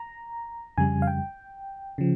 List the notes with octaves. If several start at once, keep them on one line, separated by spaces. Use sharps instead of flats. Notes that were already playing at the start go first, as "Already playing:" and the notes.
Already playing: A#5
F2 C#3 G3 G#5
F5
G5
C#3 F3